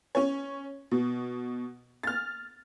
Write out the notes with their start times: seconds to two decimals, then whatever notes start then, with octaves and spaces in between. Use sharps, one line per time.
0.15 C#4 C#5
0.91 B2
2.03 F6 A6